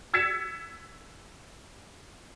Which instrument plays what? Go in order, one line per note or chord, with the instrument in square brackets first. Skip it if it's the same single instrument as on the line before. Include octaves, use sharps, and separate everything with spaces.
[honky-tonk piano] E6 G#6 A6 B6 C#7 E7